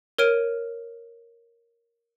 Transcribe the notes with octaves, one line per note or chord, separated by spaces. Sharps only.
A#4 C#5 F6 D7 D#7